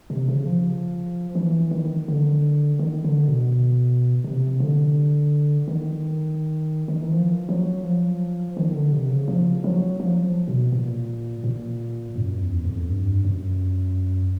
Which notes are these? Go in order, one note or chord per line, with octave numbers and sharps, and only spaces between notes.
C3
C#3
F3
E3
D#3
D3
D#3
D3
B2
C3
D3
D#3
D#3
E3
F3
F#3
F3
D#3
D3
C3
C#3
F3
F#3
F3
B2
A#2
A#2
F#2
E2
F2
G2
F#2